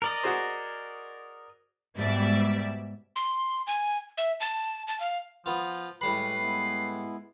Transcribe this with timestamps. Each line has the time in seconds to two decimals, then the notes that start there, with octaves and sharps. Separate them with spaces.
0.02 A#4 D5 D#5
0.23 F#4 G#4 C5
1.96 G#2 B2 G3 D5 E5
3.16 C6
3.67 G#5
4.18 E5
4.40 A5
4.88 A5
5.00 F5
5.46 F3 B3 F4
6.01 A2 G3 G#3 B4 B5 C7
6.39 G#3 B3 E4